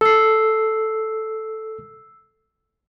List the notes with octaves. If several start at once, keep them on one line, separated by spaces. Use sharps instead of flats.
A4 E6 C7